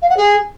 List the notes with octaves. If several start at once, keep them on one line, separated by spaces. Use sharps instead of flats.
F5
F#5
G#4